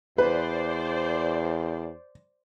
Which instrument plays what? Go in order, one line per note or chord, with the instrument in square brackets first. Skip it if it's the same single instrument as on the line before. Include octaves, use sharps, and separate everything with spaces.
[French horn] E2 [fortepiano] B4 [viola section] C5 D5